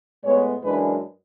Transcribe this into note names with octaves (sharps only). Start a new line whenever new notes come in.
A2 G#3 B3 C#5
F#2 E3 G#3 D4 B4